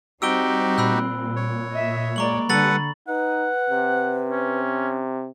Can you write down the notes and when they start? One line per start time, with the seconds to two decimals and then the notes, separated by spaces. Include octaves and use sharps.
0.22 G3 C4 D#4 F#4 G4 E6 D7 G7
0.78 A#2 B5 E6 F#6
1.36 C#5
1.73 D#5 E5
2.16 G#3 A#3 D5 A#5 C#6 F#7
2.49 D3 G3 A4 B4 F#5 B5 A6 F#7
3.08 D#4 B4 F#5
3.70 C3
4.30 C#4